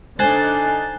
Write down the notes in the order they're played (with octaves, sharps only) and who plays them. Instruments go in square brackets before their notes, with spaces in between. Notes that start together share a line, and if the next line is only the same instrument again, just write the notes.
[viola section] D3 D4 D#4 [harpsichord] C5 [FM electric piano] G#5 F#6 A6